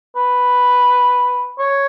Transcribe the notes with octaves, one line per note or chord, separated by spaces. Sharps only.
B4
C#5